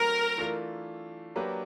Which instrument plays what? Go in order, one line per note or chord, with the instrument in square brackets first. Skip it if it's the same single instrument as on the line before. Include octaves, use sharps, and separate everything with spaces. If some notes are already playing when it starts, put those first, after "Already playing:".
Already playing: [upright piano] F#3 A3 C4 [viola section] A#4
[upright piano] E3 A3 D4 F4
F#3 A#3 D4 G4 B4